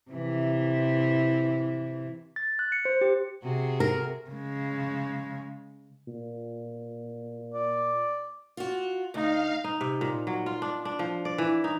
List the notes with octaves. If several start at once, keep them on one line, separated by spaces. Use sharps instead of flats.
C3 E3
A6
F#6
C#7
C5
G4
C3 F#4 G#4
A#4
C#3 G#3
A#2
D5
F4 F#4
D2 D#4 F5
D#4
C3
A#2
F#3
F4
D4
D4
F3
D5
E3
D#4